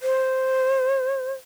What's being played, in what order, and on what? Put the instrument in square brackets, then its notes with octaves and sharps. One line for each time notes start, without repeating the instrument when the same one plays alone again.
[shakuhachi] C5